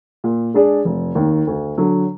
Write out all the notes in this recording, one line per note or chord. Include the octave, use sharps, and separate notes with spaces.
A#2
G#3 D4 G#4 D5
F1
D#2 D#3
D2
D3 F#3